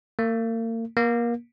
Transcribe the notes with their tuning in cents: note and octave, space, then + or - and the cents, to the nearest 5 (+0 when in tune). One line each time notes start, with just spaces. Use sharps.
A#3 -40
A#3 +25